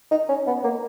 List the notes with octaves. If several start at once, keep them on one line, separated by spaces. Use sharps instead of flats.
D#4
C#4
B3
A#3